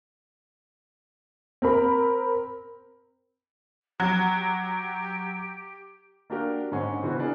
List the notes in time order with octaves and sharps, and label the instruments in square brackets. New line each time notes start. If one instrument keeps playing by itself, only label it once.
[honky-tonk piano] C4 A#4 B5
[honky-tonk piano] F#3 [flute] G4
[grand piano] A#3 D4 F#4 G4 A#4
G#2 D3 G#3 C4 C#4 D#4
C#3 E3 B3 C4 F#4
D4 G#4 A#4